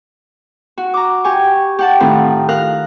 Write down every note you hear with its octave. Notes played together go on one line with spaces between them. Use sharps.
F#4
A#5 D6
G4 G#5 C#6
G4 F#5 A5
A2 D#3 C4 F4
A#4 F5 F#6